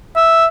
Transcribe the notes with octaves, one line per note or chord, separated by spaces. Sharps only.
E5